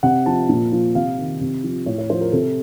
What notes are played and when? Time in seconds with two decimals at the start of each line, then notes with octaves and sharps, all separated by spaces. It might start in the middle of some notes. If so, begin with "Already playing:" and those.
0.03 C3 F#5
0.26 F3 A5
0.49 A#2
0.72 F3
0.95 C3 F5
1.18 D#3
1.41 C3
1.64 F3
1.86 A2 C#5
1.98 C#5
2.10 F3 C5
2.21 A#4
2.32 C3 A4